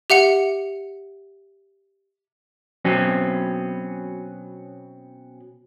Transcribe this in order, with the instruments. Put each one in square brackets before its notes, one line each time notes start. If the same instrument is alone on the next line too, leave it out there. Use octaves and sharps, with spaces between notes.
[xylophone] G4 E5 F#5 C#7
[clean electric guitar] B2 F#3 C4 C#4